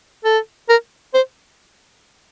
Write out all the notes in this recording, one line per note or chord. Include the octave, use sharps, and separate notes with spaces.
A4
A#4
C5